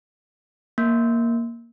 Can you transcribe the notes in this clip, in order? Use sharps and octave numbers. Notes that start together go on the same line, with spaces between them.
A#3